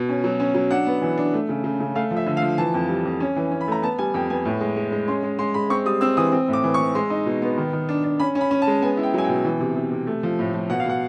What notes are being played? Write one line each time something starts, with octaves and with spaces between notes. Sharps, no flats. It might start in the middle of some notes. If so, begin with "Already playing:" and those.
Already playing: B2
C#4
F#3
C#4
F#3
D4 F#5
B3
E3
D4
A3
C#3
C#3
C#3
A3 F5
F3
E5
D3
F5
F3
E3 A5
F2
G3
F2
C#4
E3
C#4
B5
A3 A#5
B3 A5
G3 G#5
F2 G5
B3 G#5
A2
G#3
G#3
G#3
C#4 C6
G#3
G#3 C6
G#3 B5
C4 C#6
G3 D#6
C4 E6
E3 D#6
C4
A2
D6
E3
C#6
E3
G#3 C6
D#4
B2
B3
D#3
D#3
D4
D4
C#4 B5
C#4
B5
C#4
A5
G#3
B3 G#5
E4
G5
F#3 G#5
B2 G5
E3
C3
C3
C3
A3
F3
A2
F3
B2 F#5
F5
B2 F#5